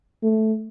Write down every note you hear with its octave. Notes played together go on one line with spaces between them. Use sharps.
A3